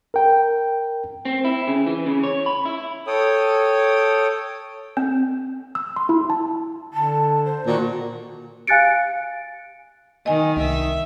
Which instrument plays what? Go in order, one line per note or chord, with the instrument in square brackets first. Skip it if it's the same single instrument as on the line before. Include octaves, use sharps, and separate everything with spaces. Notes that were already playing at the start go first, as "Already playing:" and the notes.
[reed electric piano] A#4 G5
[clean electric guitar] C4
E4
C#3
E3
C#3
C#5
B5
E4
[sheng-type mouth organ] A4 C#5 G5 D#6
[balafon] C4
[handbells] E6
C6
E4
A5
[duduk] D3 [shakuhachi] A5
[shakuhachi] C5
[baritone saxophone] A#2 [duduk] D#3 [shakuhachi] F#4
[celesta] F5 G#5 F#6 A6 C#7 D7
[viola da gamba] D#3 [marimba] D#5 G#5
[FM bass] C2 [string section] E5